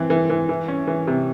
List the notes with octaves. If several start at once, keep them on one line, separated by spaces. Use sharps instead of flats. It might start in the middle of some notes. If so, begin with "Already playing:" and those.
Already playing: E3 C4
E3
E3
E3
C#4
E3
C3